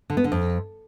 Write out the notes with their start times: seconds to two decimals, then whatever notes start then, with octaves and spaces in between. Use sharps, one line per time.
0.10 D3
0.17 B3
0.24 D3
0.32 F2